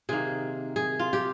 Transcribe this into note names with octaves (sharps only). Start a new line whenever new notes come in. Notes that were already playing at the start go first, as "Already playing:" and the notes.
C3 D#3 A#3 G#4
G#4
F4
G4